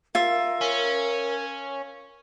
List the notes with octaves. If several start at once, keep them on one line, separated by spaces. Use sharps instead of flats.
F4 A#4 E5
C#4